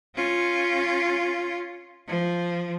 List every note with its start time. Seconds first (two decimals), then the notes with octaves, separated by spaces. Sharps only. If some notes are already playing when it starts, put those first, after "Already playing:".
0.15 C#4 F4
2.08 F3